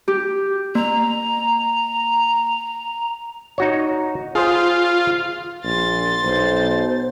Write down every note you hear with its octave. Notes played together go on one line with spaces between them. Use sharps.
G4
A#3 A#5
D#4 F#4 C#5
F4 G#4 C5
A#1 C6 A6
B1 C5